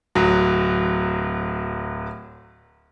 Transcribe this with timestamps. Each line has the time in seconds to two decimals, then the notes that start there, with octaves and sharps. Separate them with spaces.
0.15 D1 F#3